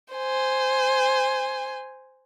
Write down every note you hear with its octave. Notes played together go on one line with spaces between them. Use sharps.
C5 G#5